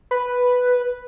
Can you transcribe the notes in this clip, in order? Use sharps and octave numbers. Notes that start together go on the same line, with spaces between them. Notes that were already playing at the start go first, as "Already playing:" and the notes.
B4